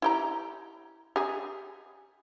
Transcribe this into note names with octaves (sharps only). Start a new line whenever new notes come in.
E4 G4 A#5
G4 G#4